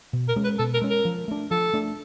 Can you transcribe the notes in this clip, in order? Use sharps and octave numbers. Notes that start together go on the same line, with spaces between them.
B2
A#4
G#3 C#4
B4
B2 A4
A#4
G#3 C#4
A#4
F3
A3 D4
F3 A4
A3 D4